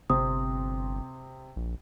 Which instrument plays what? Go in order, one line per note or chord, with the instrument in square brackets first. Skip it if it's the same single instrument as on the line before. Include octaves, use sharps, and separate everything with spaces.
[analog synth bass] G1 [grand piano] C3 C4 [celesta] D#6
[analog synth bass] A#1